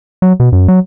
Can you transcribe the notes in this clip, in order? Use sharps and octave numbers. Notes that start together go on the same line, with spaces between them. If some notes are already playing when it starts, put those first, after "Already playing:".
F#3
B2
F#2
F#3